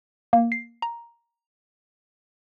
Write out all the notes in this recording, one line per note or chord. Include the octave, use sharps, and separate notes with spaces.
A#3
C7
A#5